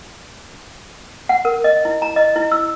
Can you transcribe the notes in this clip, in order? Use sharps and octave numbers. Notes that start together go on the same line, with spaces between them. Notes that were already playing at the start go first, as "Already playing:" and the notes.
F#5
A#4
D#5
E4
A#5
D#5
E4
E6